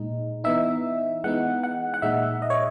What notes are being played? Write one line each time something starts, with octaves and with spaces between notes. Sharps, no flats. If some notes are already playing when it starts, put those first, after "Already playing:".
Already playing: A#2 G#3 D#4
E3 B3 D#4 E5
E3 G#3 B3 D#4 F#5
F#5
F#5
A#2 G#3 D#4 E5
D#5
C#5